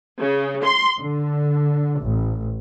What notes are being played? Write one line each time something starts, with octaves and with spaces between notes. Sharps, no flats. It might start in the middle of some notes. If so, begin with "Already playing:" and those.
C#3
C6
D3
A1